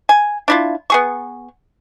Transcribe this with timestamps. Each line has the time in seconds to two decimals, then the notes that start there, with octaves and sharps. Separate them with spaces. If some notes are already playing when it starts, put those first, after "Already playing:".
0.09 G#5
0.48 D4 E4 F4
0.90 B3 G#4 C#6